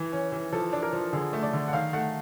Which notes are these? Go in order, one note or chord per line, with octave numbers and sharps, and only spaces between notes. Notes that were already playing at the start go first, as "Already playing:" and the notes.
Already playing: E3
C#4
E3
F3 A4
D4
A#4
F3
D3 G#4
A3
D5
D3
F#5
D#3 F5
A3 F#5